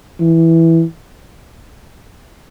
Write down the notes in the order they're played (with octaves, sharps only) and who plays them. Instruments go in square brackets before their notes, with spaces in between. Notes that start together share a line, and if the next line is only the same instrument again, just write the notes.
[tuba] E3